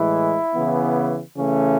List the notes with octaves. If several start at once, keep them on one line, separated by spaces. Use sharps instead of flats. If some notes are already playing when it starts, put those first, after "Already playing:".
Already playing: A2 E3 G#3 E4
C#3 E3 B3
C#3 E3 A3 C#4